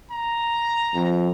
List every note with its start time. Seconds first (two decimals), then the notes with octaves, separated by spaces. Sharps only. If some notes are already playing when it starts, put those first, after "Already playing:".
0.11 A#5
0.95 F2